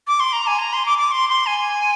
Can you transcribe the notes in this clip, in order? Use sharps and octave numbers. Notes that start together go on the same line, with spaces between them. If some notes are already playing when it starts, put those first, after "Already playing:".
D6
C6
A#5
G#5
A#5
C6
D6
D6
C6
C6
G#5